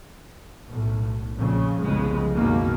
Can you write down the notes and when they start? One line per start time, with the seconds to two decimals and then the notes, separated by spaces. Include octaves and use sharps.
0.67 B1 A2
1.36 A#1 F2 A#2 C#3
1.81 F1 C2 F2 C#3 G#3 B3
2.34 C2 F#2 B2 D#3 A#3